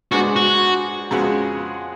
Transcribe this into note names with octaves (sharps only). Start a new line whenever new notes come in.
G#2 G#3 B3 D4 F#4
F#4
F2 C#3 G#3 B3 F#4